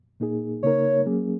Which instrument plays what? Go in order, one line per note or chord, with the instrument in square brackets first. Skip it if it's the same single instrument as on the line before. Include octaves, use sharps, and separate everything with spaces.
[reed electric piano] A#2 A#3 D#4 G#4
[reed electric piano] C#3 A#3 D#4 A#4 [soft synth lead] C#5
[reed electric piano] F#3 A#3 C#4 G#4